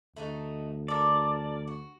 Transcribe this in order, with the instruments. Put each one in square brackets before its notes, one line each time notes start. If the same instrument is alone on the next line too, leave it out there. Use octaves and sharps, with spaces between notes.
[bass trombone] D2 [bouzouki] A3 D#4 F#4
[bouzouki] A4 A#4 [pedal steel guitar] D5
[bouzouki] F#4